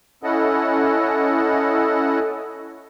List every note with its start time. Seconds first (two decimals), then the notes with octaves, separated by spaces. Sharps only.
0.23 C#4 E4 A4 D#5 F#5